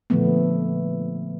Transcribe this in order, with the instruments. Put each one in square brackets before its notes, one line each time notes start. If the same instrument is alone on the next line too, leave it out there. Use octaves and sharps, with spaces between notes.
[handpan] A#2 D3 F3 A3 B3